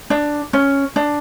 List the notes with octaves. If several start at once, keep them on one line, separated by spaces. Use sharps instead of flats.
D4
C#4
D4